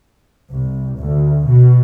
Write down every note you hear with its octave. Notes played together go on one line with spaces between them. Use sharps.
C2
D2
B2